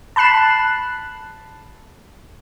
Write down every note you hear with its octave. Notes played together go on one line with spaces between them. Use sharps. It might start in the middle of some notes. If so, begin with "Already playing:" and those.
A5 B5 F#6 C7 E7